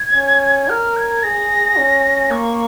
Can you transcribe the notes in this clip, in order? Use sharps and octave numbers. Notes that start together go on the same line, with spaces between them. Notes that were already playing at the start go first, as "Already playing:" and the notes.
Already playing: G#6
C#4
A#4 F6
G#6
G#4 A#6
C#4
A#3 C#6